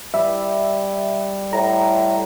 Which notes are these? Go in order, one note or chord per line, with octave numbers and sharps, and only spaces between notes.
G3 E5
A2 A#5